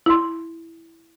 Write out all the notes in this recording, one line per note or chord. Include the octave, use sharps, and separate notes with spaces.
E4 C6